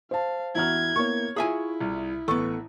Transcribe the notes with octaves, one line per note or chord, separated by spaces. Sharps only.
C5 F5 A5
E2 E4 F#4 A#5 F6 G#6
A#3 B3 E4 C#5 C#6
E4 F4 G#4 E5 G#5 D#6
C2
A1 B3 A4 C#6